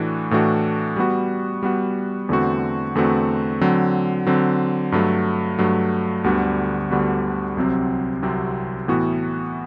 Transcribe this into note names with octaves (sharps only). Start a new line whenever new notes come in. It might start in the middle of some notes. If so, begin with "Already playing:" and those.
Already playing: A2 E3 A3 D4 F#4
A2 E3 A3 D4 F#4
G3 B3 F#4
G3 B3 F#4
E2 D3 A3 C4 F#4
E2 D3 A3 C4 F#4
D3 F#3 C4
D3 F#3 C4
G2 F#3 A3
G2 F#3 A3
D2 D3 G3 B3 F#4
D2 D3 G3 B3 F#4
C2 C3 F#3 C4
C2 C3 F#3 C4
A2 E3 B3 F#4